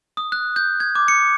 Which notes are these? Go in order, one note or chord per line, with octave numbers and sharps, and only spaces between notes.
D#6
F#6
G6
G#6
D6
C#7